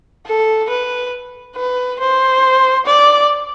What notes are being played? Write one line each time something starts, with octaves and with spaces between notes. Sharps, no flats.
A4
B4
B4
C5
D5